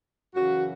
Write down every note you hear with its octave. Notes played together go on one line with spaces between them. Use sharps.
F#2 C#3 E3 F#4